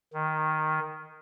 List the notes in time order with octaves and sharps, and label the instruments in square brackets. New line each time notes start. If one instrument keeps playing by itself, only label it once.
[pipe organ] D#3